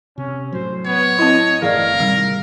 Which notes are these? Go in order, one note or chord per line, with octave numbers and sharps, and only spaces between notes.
C3 C#4
A2 F#3 C5
B3 C#5
C4 E4 D#5
G1 A2 E3 G#4 A#4 D5 F5
A2 C3 D#3 G3